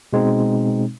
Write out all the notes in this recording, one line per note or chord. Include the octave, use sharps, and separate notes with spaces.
B2 G#3 C4 D#4